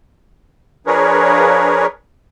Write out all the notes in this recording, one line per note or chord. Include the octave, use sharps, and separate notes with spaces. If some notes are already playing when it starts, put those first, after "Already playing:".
F3 D4 G#4 A#4 B4 C#5